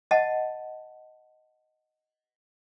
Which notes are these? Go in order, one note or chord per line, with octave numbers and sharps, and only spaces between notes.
D#5 F#5 A5